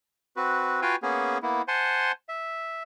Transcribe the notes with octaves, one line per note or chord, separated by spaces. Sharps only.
C4 F#4 B4
F4 F#4 B4 F5 G5 G#5
A#3 B3 C#4 G#4
A#3 B3 E4
C5 F#5 G#5 A5 C6
E5